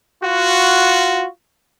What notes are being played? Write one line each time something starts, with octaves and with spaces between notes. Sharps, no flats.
F4 F#4